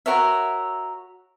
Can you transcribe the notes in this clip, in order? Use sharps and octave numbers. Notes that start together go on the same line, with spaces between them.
F#4 A#4 C#5 E5